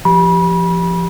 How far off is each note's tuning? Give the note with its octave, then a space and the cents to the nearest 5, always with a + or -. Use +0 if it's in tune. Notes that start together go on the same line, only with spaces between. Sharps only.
F3 -20 G4 +0 B5 -30